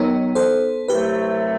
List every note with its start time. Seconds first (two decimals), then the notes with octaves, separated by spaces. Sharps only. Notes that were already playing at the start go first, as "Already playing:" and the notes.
Already playing: D#2 D#3 F#3 B3 D#4
0.35 A4 C5
0.88 C2 C3 F#3 A3 G4 B4